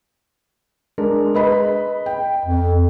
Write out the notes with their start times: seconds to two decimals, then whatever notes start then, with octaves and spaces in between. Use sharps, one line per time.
0.98 G#3 D4 A#4
1.35 B4 D#5 B5
2.06 G5
2.46 F2